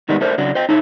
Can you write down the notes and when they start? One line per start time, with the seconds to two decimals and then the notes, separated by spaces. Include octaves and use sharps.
0.09 G#2 D#3 G3 G#3 B3 D4
0.21 A3 D4 A#4 C5
0.38 C#3 F#3 D4
0.55 C5 D#5 G5
0.69 D#4 E4 A4 C#5